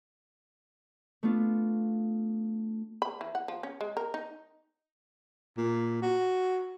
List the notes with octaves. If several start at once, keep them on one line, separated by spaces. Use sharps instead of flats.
A3 B3 D4 F4
B5
E3
F#5
F3
C#4
G#3
A#4
D#4
A#2
F#4